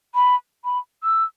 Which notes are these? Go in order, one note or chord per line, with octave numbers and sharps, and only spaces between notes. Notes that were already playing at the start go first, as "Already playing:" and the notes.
B5
B5
E6